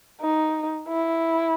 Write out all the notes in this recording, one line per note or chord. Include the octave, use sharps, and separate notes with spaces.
D#4
E4